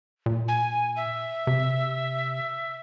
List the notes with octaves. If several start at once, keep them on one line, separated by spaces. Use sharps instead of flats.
A#2
G#5
E5
C3